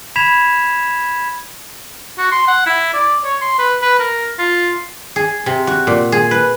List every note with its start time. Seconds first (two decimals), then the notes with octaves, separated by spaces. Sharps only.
0.16 B5 G#6 B6 E7 F7
2.18 F#4
2.32 C6
2.48 F#5
2.66 E4
2.94 D5
3.24 C#5
3.41 C6
3.59 B4
3.82 B4
3.99 A#4
4.39 F4
5.16 G#4
5.46 C3
5.67 F#4
5.87 A#2
6.12 G#4
6.31 B4